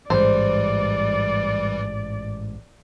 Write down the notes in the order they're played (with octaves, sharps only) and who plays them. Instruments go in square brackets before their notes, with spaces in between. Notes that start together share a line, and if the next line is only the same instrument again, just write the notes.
[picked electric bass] A1 G#2 [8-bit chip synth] E3 G3 [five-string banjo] C5 [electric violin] D5